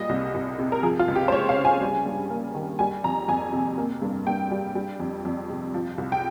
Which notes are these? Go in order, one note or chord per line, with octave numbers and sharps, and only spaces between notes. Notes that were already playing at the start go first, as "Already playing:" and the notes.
Already playing: A#2 G3 D#5
C2
C2
C3
A#4
F3 G#4
F4
C#2
G4
C5
G#3 C#5
F5
C#3
G#5
G3
G2
A#3
D#3
G3 G#5
F2 A#5
F2 G#5
C3
A#3
G2
G2 G5
G3
G3
F2
F2
C3
F3
C2
G5